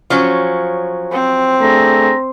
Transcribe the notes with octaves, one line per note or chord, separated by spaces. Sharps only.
F3 F#3 C#4
C4
A3 D4 G#4 A#5